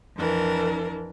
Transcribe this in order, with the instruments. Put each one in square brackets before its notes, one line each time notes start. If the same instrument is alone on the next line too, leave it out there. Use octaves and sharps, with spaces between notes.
[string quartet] F2 E3 D4 A#4